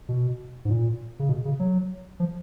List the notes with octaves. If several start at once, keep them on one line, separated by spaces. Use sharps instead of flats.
B2
G#2
A#2
C#3
B2
C#3
F#3
F3